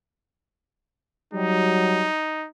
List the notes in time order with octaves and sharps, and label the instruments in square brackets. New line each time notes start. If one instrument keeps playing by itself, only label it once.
[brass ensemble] F#3 G3 [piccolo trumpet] D#4